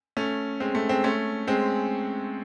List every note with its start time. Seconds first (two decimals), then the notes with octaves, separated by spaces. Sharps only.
0.17 A3 C#4
0.60 G#3 C4
0.75 A3
0.89 G#3 C4
1.04 A3 C#4
1.47 G#3 C4